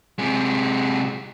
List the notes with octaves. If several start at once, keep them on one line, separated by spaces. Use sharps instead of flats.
C3 G#3